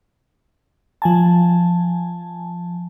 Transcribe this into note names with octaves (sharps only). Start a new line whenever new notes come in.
F3 G#5 A5